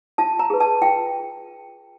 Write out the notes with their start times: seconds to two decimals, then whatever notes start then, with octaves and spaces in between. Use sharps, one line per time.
0.18 F4 A5
0.39 A#5
0.50 G#4 B4
0.60 A5
0.81 F4 G5